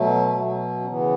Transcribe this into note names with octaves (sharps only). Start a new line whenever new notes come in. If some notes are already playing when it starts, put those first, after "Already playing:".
Already playing: B2 F#3 A3
B2 F#3
C#4
C#3 E3 B3